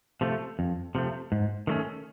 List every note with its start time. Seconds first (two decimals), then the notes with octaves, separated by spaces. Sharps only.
0.21 C3 F3 A3
0.59 F2
0.95 C3 F3 A3
1.32 G#2
1.67 D#3 F#3 A3 C#4